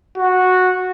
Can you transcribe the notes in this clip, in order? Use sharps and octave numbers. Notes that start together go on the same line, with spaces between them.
F#4